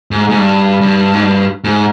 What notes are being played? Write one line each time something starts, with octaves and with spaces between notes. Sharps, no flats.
G#2
G#2
G2
G2
G#2
G2
G#2